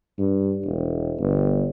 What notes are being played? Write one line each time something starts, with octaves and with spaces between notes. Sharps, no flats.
G2
E1
G1